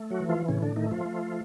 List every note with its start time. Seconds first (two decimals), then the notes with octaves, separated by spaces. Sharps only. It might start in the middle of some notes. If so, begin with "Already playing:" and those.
Already playing: A3
0.10 F#3 F#4
0.20 E3
0.29 F3 F4
0.48 A2 C#3 C#4
0.62 D3 D4
0.76 D#3 A3 D#4
0.91 F3 F4
1.05 A3